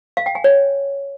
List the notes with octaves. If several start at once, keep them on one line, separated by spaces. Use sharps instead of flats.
F5
G5
G#5
C#5